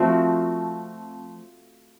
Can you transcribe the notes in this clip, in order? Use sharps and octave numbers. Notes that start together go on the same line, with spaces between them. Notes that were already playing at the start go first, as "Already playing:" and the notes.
Already playing: F3 A3 C4 F#4